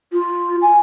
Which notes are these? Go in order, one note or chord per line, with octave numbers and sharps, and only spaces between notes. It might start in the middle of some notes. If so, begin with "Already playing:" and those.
F4
G#5